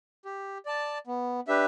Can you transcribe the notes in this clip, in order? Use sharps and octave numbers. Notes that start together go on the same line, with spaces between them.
G4
D5 A5
B3
D4 G4 B4 E5